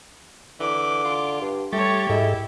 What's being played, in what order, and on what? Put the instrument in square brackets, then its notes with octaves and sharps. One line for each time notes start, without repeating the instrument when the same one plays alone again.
[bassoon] D3 [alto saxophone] E3 [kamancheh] D6
[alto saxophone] F4
[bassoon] G2
[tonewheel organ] G3 A6 [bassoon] A3 [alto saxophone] G4 [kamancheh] C#5 C#6
[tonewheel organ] G#2 A4 E5 [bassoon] G#3 [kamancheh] E4